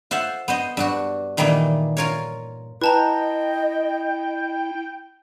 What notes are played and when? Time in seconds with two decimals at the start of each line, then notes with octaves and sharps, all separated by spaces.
0.11 F4 C5 E5 F#5
0.48 B3 C5 D#5
0.77 G2 D4 F#4
1.37 A#2 D#3 E3 G3 A#3 D#4
1.97 F4 A#4 C#5
2.81 E4 B4 D#5 G5 A5 A#5